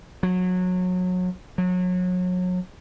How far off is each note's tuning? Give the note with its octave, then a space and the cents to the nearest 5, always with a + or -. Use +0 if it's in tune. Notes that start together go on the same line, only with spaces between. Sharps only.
F#3 -25
F#3 -30